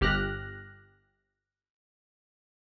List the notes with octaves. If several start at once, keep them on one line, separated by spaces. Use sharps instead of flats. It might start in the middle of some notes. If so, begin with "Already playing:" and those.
G1 G4 F6 F#6 A#6